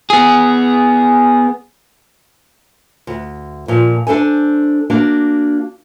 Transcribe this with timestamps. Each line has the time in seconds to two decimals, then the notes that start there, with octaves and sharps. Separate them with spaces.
0.10 B3 G#4
3.07 D2
3.68 A#2 F3
4.07 D4 A4 C5 G#5
4.90 A#3 D4 F#4